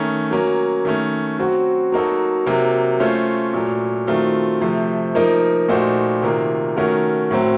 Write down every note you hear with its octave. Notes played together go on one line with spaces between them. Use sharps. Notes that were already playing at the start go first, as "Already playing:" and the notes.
Already playing: D#3 A3 C#4
F#3 A#3 C#4
D#3 A3 C#4
F#3 C4 F#4
F#3 A#3 D#4 F#4 A4
C3 F#3 A#3
A3 C#4 F4 C5
A#2 F#3 A3
D#3 F#3 A3 C4 F4
C3 F3 A3
F3 A#3 D#4 A#4
A#2 A3 D#4 F#4 C5
C3 D#3 A#3 F4
D#3 A3 C#4 F#4 A#4
A2 F#3 C4